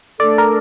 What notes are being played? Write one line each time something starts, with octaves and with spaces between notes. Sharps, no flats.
A3 D4 A4 D5
A#4